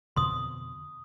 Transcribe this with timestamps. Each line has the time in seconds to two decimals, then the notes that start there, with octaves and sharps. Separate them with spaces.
0.16 F2 B2 D3 C6 D#6